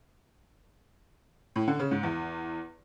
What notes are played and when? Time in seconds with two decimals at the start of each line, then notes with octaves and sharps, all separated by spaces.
1.56 A2
1.68 D3
1.79 C#3
1.91 G#2
2.03 E2